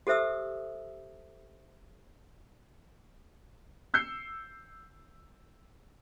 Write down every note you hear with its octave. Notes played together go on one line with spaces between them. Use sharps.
G4 A4 C5 E5 D#6 E6
E6 G6 C7 C#7